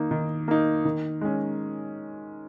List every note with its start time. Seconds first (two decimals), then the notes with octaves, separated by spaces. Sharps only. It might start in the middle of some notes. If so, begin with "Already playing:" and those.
Already playing: D#3 A#3 D#4
0.11 D#3
0.48 A#3 D#4
0.85 D#3
1.21 G#3 C#4